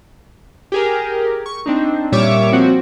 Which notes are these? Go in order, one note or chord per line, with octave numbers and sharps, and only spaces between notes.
G4 G#4 A#4
C#6
C4 D4 D#4
A#2 G3 C#5 E5 C#6 D6
F3 C4 F#4